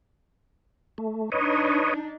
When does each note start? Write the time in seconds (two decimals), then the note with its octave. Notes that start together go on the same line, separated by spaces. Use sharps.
0.98 A3
1.32 D4 D#4 B4 C#5 D#5